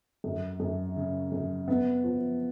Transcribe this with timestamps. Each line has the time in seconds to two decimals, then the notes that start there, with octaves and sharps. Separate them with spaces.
0.24 F#2
0.60 F#2
0.96 C#3
1.32 F#2
1.68 B3
2.04 F3